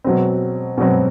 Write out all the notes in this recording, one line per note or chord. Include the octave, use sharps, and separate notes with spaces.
B2 F#3 C4
B2 F#3 C4